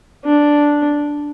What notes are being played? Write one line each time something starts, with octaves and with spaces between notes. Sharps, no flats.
D4